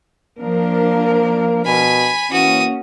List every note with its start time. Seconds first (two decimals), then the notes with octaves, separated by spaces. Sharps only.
0.39 F3 A#3 D4 A#4
1.66 B2 G#5 B5
2.32 E3 A#3 C#4 F#4 D#6